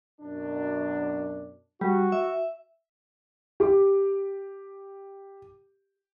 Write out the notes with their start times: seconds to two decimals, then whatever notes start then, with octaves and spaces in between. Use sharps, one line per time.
0.21 F#2 B2 D4
1.81 G3 F#4
2.12 E5
3.60 G4 D6